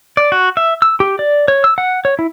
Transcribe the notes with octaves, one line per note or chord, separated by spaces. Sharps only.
D5
F#4
E5
E6
G4
D5
C#5
E6
F#5
C#5
E4